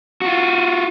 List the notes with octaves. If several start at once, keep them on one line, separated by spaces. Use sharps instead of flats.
F4 F#4